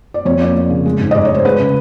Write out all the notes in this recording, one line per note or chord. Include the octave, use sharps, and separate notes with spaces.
D5
F2 C#5
A#3 D5
A#3
C#3
G#3
G#2
D#5
G#2 D5
C#5
G#2 C5
G#3 B4
C#3